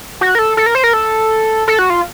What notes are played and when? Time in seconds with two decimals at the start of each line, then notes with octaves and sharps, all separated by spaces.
0.21 F#4
0.35 A#4
0.39 A4
0.57 A4
0.66 A#4
0.75 C5
0.84 A#4
0.93 A4
1.68 A4
1.79 F#4
1.90 F4